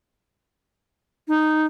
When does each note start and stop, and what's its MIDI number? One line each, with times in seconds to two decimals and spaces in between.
1.28 1.66 63